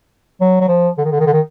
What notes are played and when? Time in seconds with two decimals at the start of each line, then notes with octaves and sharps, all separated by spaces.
0.41 F#3
0.61 F#3
0.68 F3
0.98 D3
1.05 D#3
1.11 D3
1.20 D#3
1.26 D3
1.33 D#3